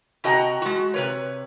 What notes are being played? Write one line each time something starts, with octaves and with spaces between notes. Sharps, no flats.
C3 F#4 D#5 G5 G#5 A#5
G#3 F#4
C3 B4 C#5